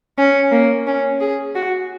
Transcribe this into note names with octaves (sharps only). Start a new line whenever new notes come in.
C#4
A#3
C#4
G#4
F#4